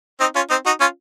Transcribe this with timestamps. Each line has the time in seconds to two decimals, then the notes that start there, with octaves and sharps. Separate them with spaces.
0.20 C4 D#4
0.35 C#4 F4
0.50 C4 D#4
0.66 D#4 F#4
0.80 C#4 F4